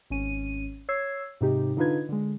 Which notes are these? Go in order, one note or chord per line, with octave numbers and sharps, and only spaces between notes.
G#1 C#4 D#7
C#5 E6 G#6 C7
G#2 C3 D#4 G4
D3 D4 D#4 F4 B4 G#6
D3 G#3